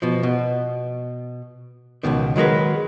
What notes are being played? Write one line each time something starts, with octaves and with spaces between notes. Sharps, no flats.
B2 F3
B2
C#2 F#2 B2 D#3
D#3 F#3 G#3 A#4 B4